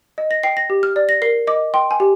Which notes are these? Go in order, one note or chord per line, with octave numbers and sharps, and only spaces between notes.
D#5
A#6
G5 C7
A#6
G4
F6
D5
A#6
A#4 C7
D#5 D6
G5 C6
G#5
G4